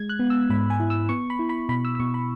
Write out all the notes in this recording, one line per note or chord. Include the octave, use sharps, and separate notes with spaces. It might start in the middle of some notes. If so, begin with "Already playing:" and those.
Already playing: G#3 G#6
F#6
B3
E6
G#2 B5
G#5
E4
E6
B3 C#6
B5
E4
B5
B2 B5
E6
E6
B2 C#6
B5